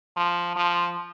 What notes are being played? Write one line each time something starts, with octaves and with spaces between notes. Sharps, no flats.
F3
F3